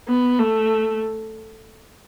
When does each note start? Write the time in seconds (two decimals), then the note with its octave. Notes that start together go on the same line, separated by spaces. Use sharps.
0.09 B3
0.39 A3